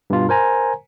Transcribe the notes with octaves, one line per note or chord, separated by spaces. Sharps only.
G2 B2 F4
A#4 C5 G#5 A#5